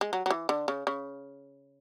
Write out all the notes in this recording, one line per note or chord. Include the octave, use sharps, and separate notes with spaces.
G#3
F#3
F#3
E3
D3
C#3
C#3